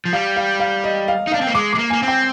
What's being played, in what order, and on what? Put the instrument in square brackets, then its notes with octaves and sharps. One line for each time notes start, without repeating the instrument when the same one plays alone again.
[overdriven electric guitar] F3
[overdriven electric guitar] G3 [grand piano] F5
[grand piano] F5
F5
D#5
F5
[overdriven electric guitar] D#4
[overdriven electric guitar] D4 [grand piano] F5
[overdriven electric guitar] C4
A#3
[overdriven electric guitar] G#3 [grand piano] D6
[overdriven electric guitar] G#3 [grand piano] D6
[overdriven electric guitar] A#3
[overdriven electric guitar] A#3 [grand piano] G#5
[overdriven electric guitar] C4
[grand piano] G5